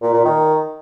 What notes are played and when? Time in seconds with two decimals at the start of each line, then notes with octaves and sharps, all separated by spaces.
0.02 A#2
0.13 A#2
0.25 D#3